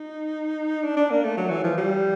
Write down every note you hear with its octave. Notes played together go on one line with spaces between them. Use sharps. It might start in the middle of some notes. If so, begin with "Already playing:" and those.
Already playing: D#4
D4
D4
A#3
A3
F#3
E3
F3
G3